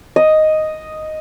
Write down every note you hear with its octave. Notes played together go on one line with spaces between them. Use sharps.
D#5